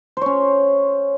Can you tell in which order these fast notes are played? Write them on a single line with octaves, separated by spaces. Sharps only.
C5 C#5 C#4